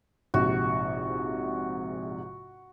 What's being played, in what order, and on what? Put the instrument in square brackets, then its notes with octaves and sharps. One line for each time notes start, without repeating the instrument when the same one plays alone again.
[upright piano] A#1 G#2 C3 [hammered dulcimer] F#4